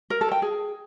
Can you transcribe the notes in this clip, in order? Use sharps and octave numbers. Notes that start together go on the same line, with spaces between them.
A#4
A4
G5
G#4